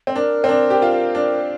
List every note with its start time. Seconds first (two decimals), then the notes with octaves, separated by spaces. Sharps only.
0.07 C4
0.15 D4 A#4
0.44 C4
0.49 D4
0.70 G4
0.82 F4
1.15 D4